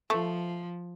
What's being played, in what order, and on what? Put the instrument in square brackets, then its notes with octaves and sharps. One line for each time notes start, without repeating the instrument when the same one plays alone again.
[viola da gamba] F3 [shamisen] A3